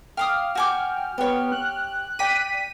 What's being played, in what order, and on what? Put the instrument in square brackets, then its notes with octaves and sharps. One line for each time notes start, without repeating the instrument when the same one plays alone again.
[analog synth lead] F5 [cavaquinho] G5 D6 D#6 [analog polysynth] F6
[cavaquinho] F#4 G#5 D6 [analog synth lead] G5
[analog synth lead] B3 [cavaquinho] G4 C#5
[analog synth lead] F#6
[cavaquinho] D5 [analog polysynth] G5 B6 D#7